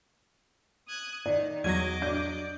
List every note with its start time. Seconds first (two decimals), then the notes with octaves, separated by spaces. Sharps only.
0.87 D#6 F#6 G#6
1.26 D#3 D5
1.64 E2 F#3 D#5 D6 G#6 A#6 D#7
2.02 D4 G6